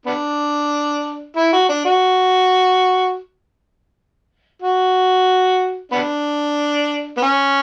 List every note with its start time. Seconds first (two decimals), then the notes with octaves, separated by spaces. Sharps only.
0.06 B3 D4
1.36 E4
1.53 F#4
1.69 D4
1.85 F#4
4.62 F#4
5.92 B3 D4
7.17 B3
7.23 C#4